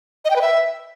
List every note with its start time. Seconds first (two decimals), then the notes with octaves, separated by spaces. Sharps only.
0.25 D#5
0.30 G5
0.36 B4
0.41 E5